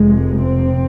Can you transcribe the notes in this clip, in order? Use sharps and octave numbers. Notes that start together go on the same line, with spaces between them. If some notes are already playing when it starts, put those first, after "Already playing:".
Already playing: F1 F2 C3 G#3
C4